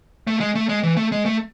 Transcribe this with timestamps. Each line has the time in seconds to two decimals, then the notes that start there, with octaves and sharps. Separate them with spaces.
0.27 A3
0.40 G#3
0.55 A3
0.69 G#3
0.83 E3
0.97 A3
1.12 G#3
1.26 A3